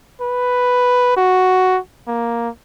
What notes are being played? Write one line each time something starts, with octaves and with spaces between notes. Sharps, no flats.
B4
F#4
A#3